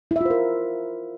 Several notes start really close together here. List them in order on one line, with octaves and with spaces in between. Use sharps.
E4 E5 F4 C5 A#4